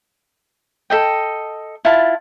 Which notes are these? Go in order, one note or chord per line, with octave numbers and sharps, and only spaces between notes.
A4 D#5 G5
E4 F4 A5